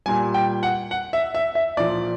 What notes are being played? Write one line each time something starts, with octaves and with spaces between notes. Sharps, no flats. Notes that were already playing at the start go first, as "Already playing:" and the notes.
A#2 G3 G#5
G5
F#5
F#5
E5
E5
E5
A#2 F3 D5